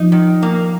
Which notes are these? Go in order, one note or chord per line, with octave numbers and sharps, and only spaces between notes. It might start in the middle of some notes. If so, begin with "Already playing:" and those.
Already playing: F3 D#4
D#3
A#3